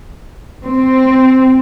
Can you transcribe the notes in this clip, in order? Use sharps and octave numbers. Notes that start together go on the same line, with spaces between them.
C4